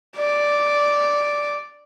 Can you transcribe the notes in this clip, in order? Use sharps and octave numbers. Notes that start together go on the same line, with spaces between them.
D5